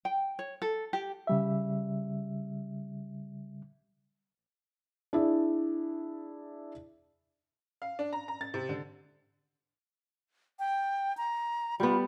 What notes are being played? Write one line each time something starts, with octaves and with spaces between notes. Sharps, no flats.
G5
C#5
A4
G4
C#3 G3 E5
D4 E4 G#4 D5 E5
F5
D4
A#5
A#5
A6
C3
D3
G5
A#5
G3 B3 F4